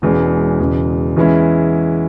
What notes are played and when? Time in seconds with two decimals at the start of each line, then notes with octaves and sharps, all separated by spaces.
0.02 E1 E2 E3 G#3 C#4
0.59 E1 E2 C#3 G#3
1.17 E2 E3 G#3 C#4 E4